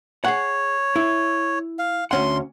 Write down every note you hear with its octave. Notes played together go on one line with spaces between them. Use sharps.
G#4 C#5 F#5
E4
F5
D2 C#4 F#5 C6